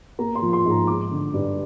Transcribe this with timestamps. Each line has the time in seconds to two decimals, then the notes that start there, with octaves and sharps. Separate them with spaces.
0.19 A#3 A#5
0.35 C6
0.42 F3
0.53 C6
0.65 G#2 A#5
0.87 G#3 D6
1.11 D3
1.34 G2